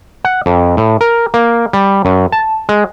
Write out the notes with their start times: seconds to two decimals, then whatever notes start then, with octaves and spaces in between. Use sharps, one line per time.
0.25 F#5
0.46 F2
0.77 A2
1.01 A#4
1.34 A#3
1.73 G3
2.05 F#2
2.32 A5
2.69 G#3